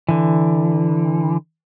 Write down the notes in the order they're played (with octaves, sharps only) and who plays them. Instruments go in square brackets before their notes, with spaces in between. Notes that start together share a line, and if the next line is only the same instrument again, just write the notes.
[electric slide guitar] D3 E3